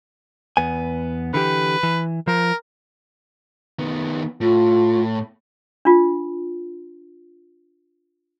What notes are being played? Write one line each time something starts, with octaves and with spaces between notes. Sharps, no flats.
E2 B3 G#5
D3 E3 G4 B4
E3
F3 A#4
D#3 B3
A2 F4
D4 F4